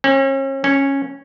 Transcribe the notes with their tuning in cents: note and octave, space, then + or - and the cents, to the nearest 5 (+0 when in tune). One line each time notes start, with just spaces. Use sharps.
C#4 -40
C#4 -10